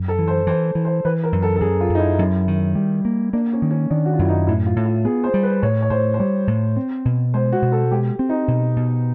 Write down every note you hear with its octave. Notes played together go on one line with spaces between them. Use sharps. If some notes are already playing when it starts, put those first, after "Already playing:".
Already playing: F#2
A4
E3
C5
E3 C5
E3
C5
E3 B4
A#4
F#2
A4
A4
F#2 G#4
F4
F#2
D#4
E4
F#2
D#3
G3
A#3
A#3 D4
C#4
D#3
C#4
D#3 D4
F#4
F4
F#2 E4
D#4
A2 E4
F4
A2
F4
B3 G#4
C5
G3
B4
A2 C#5
C#5
A2 C5
C5
G3 C#5
A2
C4
B2
G#3 C5
F#4
B2
A4
G#3 G4
C4
D#4
B2
B2